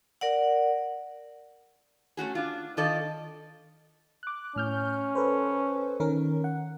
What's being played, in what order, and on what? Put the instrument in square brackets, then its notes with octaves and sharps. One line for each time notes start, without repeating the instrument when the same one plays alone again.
[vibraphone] A#4 D5 F#5
[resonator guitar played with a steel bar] A3 C#4 F#4 G#4
D4 F4
D#3 F4 A4 D5 D#5
[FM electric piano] D6 F#6
[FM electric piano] A2 F6 G6 [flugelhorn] C#4
[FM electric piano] A4 B4 C5
D#3 C#4 A#4
F#5